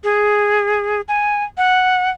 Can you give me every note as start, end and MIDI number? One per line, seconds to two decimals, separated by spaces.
0.04 1.01 68
1.08 1.44 80
1.58 2.10 78